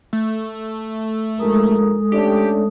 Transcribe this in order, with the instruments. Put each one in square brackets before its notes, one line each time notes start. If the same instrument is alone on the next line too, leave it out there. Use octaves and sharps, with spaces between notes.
[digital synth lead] A3
[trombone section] A#1 G#2 A#4 [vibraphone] G#3 A4 D#6
[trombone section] A3 C#4 D4 [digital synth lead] G4